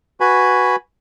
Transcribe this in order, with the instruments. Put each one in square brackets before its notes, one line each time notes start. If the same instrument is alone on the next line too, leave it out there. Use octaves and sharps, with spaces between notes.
[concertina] F#4 B4 G#5 B5